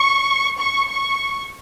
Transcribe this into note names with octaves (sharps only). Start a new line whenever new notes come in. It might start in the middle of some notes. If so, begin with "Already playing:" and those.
Already playing: C#6
C#6
C#6